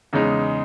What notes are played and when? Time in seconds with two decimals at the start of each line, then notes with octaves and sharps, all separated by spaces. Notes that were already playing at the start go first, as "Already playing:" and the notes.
0.13 E2 C#3 G#3 D#4